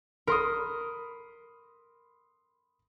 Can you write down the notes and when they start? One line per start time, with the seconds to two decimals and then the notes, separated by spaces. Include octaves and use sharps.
0.27 A#4 B5 C6 D#6